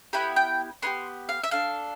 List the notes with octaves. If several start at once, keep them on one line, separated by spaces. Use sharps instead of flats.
B3 E4 G4 B5
G5
B3 E4 G4 C6
F5
E5
D4 A4 F5